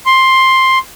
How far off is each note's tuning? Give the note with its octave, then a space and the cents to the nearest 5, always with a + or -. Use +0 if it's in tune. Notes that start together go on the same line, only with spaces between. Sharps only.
C6 +10